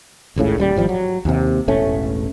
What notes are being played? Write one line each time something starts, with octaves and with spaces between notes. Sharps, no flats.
G#1 C#2 A2 C#3
D#1 F#3 G3
G#1 F3 G3
F#3
D#2 C3
E1 A1 A3 C#4